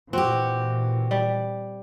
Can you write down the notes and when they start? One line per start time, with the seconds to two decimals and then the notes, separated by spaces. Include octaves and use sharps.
0.13 A#2 E3 C4 F#4 G4
1.11 G3